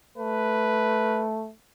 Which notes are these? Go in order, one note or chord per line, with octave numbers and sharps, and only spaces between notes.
A3 B4